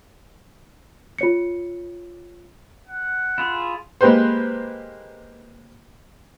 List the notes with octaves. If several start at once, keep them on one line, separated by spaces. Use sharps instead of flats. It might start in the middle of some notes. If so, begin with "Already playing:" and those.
F4 C#5 C#7
F#5
E4 F4 G#4
G#3 A#3 G4 B4 C5